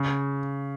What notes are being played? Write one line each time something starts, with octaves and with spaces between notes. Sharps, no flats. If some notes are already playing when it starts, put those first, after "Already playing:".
Already playing: C#3